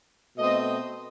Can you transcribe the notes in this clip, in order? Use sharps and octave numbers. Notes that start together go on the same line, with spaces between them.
B2 A3 C4 D#5